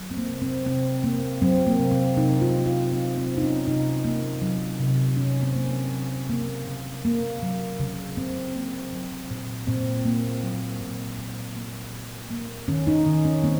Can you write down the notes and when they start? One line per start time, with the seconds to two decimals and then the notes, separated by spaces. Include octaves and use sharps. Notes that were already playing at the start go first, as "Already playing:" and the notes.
Already playing: F#3
0.11 C4
0.17 A#3
0.29 C3
0.42 C4
0.66 C3 C4
1.04 A#3
1.42 F#3 C4
1.67 A#3
1.79 C3
1.91 C4
2.17 C3 D#4
2.41 F4
2.54 A#3
2.66 F4
2.92 F#3 C4
3.17 C4
3.29 C3
3.37 D#4
3.42 C#4
3.67 C3 D#4
4.05 A#3
4.42 F#3
4.79 C3
5.17 C3 C#4
5.43 C4
5.55 A#3
5.68 A#3
5.92 F#3
6.29 C#3 A#3
6.67 C#3
7.05 A#3
7.43 F#3
7.80 C#3
8.17 C#3 C4
8.55 A#3
8.93 F#3
9.31 A#2
9.67 A#2 C4
10.05 A#3
10.43 F#3
10.81 A#2
11.18 A#2
11.56 A#3
11.93 A#3
12.30 A#3
12.68 D#3 C#4
12.87 D#4
13.06 D#3
13.25 C#4
13.44 A#3 C4